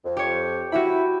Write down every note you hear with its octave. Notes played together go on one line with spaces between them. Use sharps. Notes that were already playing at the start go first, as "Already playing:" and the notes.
F2
G4 C#5
E4 F#4 G4 B5